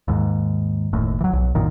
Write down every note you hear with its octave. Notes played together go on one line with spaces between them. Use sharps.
D#2 G#2
F#1 D#2 A2
E3 F#3
B1
A#1 F#2 A#2 D#3